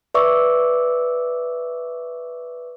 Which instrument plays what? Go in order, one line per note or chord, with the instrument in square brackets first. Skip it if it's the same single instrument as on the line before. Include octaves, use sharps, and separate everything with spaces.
[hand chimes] B4 D5 E5 C#6 D6 E6